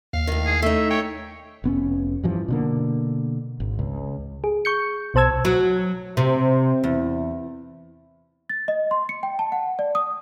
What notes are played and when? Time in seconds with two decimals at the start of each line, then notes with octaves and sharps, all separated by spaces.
0.13 D#2 F5
0.27 A2 D#3
0.46 G#4
0.62 A3 D#4 E5
0.90 C#5 G5
1.64 F1 B3 C#4
2.23 G2 E3 F3
2.48 B2 D3 A#3
3.60 G#1
3.79 C#2
4.44 G#4
4.65 C#6 G6 C#7
5.14 B1 B2 C5 A5 E6 G#6
5.45 F#3
6.17 C3
6.84 E2
8.50 A6
8.68 D#5
8.91 C6
9.09 C#7
9.23 G5
9.39 A5
9.52 F#5
9.79 D5
9.95 D#6